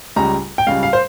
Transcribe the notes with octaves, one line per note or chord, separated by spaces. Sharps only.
C#2 C#3 G3 A#5
G5
C#2 C#3 G3 F5
F5
C5